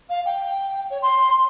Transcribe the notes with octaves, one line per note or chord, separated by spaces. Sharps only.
F5
G5
C#5
C6